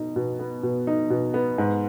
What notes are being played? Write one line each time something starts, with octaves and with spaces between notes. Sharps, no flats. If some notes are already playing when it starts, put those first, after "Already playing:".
Already playing: B2 D#4
B2
B3
B2
D#4
B2
B3
G#2